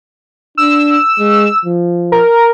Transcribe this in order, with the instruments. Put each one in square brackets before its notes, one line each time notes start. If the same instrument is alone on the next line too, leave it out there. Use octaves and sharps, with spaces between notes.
[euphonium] D4 [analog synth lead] E6
[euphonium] G#3
F3
[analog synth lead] A#4